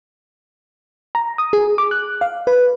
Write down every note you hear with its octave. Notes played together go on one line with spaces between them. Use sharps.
A#5
D#6
G#4
D6
F#6
F5
B4